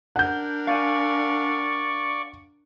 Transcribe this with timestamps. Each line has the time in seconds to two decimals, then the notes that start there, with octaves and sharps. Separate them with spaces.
0.16 D4 A#4 F#5 G6
0.67 D5 F5 G#5 C#6